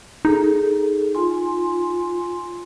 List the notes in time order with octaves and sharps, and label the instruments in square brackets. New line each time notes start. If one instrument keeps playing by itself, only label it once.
[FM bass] D#4 [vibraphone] G#4 A4
[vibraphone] F4 G#5 C6